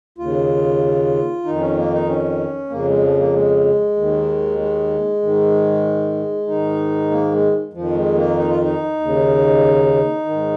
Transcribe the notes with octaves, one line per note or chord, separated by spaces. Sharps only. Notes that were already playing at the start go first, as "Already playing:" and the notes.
D#2 C#3 F4
F2 D#3 D#4
C#4
A#3
D#4
C#4
F2 C#3 A#3
G#3
F3
A#3
G#3
D#2 D#3
G#3
G#2 D#3
G#2 D#3 D#4
A#3
G#3
F2 D#3 F3
G#3
A#3
D#4
F4
D#4
D#2 C#3
G#2 D#3